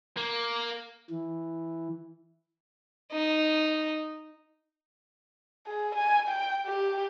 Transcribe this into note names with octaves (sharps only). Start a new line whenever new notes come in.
A#3
E3
D#4
G#4
G#5
G5
G4